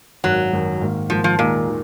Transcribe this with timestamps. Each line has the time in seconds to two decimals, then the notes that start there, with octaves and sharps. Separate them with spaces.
0.24 G#1 F#2 D#3 F#3
0.53 G#1 F#2 D#3
0.81 G#2 D#3 A#3
1.10 G#2 D#3 F3 A#3
1.24 F3
1.38 D#2 A#2 D#3 G#3 D#4 A#4
1.68 D#3